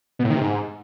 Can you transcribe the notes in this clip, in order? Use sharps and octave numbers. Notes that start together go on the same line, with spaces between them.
B2
A2
D#3
C3
G#2